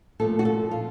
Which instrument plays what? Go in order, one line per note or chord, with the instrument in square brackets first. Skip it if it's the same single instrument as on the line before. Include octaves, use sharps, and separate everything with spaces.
[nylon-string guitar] A#2 F3 A3 A4
F#4
A4
F4